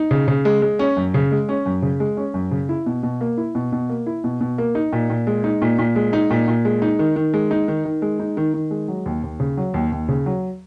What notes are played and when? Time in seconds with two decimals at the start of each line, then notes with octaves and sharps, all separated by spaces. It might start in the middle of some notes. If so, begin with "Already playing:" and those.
Already playing: D#4
0.11 C#3
0.28 C#3
0.45 G#3
0.62 G#3
0.79 C#4
0.97 F#2
1.14 C#3
1.32 G#3
1.49 C#4
1.66 F#2
1.82 C#3
2.00 G#3
2.17 C#4
2.34 F#2
2.51 C#3
2.69 E4
2.86 B2
3.03 B2
3.21 A#3
3.37 E4
3.55 B2
3.72 B2
3.89 A#3
4.07 E4
4.24 B2
4.41 B2
4.58 A#3
4.75 D#4
4.93 A#2
5.10 A#2
5.27 G#3
5.44 D#4
5.62 A#2
5.79 A#2
5.96 G#3
6.13 D#4
6.30 A#2
6.48 A#2
6.65 G#3
6.82 D#4
6.99 D#3
7.16 D#3
7.34 G#3
7.51 D#4
7.68 D#3
7.85 D#3
8.02 G#3
8.19 D#4
8.37 D#3
8.54 D#3
8.71 G#3
8.88 F#3
9.06 D#2
9.23 D#2
9.40 C#3
9.57 F#3
9.74 D#2
9.92 D#2
10.08 C#3
10.26 F#3